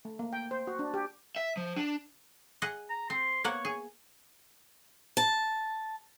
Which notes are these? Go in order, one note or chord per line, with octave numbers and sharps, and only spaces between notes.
A3
A#3
G5
C5
F#4
D4
G4
E5
F3
D4
G#4 D#5 F#5
A#5
C4 C6
A#3 B3 C#5 F#5
G#4
A5